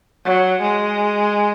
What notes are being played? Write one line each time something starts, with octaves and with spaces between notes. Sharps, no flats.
F#3
G#3